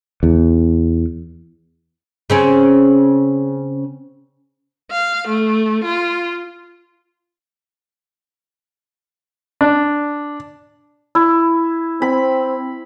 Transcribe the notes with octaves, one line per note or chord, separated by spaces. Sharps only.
E2
C#3 C4 C#4
F5
A3
F4
D4
E4
C4 B5